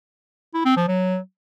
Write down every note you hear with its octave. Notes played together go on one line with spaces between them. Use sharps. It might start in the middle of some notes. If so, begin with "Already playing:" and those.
E4
C4
F3
F#3